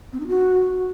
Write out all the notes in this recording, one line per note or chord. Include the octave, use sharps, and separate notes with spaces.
C4
D#4
F#4